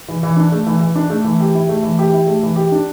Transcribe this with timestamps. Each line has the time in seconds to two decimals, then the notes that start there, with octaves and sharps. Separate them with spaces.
0.08 E3
0.23 E3
0.36 D4
0.52 A3
0.66 E3
0.81 E3
0.95 D4
1.10 A3
1.25 E3
1.40 G4
1.54 E4
1.69 A3
1.83 E3
1.99 G4
2.13 E4
2.27 A3
2.43 E3
2.56 G4
2.72 D4